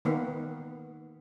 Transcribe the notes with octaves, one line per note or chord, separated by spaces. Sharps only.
D#3 A#3 B3